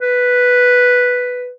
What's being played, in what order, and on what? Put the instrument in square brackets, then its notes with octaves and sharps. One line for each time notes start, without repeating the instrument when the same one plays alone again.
[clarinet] B4